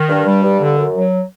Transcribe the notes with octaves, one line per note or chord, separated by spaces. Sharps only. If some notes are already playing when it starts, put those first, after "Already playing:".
Already playing: D#3
G2
G3
G2
D3
F#2
F#3